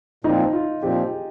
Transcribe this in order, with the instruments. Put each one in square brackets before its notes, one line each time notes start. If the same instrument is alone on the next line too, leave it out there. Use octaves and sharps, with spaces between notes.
[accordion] A#2 F3 C4 [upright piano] D#4
[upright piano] F4
[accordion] A#2 F3 C4 [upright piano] G4
[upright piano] G#4